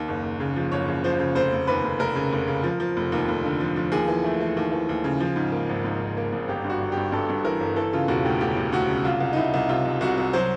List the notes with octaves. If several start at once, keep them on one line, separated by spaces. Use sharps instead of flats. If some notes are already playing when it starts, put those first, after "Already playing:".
Already playing: D#2
F#1
F#1
C#3
F3
F#1 C#5
C#3
F3 C5
C#3
F1 C5
F1
D#2 B4
F1
F1 A#4
C#3
F1
C#3
F3
F3
F1
D#2
F1
D3
F3
F3
D#2 G#4
E3
A3
E3
D#2
E3
D#2
C#3
F3
G#2
A#3
G#1
G#2
G#1
A#3
G#1
G1 G4
G2
F#4
G1
G4
G2
G2 A4
G2
E3 A#4
G1
E3 A4
C#3 F4
E1 F#4
D2 G4
D2 G4
E1
D2 F#4
C#3
C2 F4
C2
D#4
C2 E4
C2
C3 F4
C2
C2 F#4
C2
F#3 C5